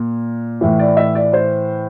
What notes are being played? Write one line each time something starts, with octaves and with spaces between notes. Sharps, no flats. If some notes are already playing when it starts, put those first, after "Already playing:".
Already playing: A#2
A2 E3
D5
E5
D5
C5